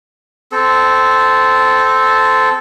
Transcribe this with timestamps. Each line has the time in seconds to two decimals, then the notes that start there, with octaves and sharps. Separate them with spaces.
0.52 C4 A4